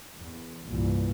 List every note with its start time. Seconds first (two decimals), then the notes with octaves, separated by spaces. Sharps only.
0.16 E2
0.66 C2 G2 A#2 E3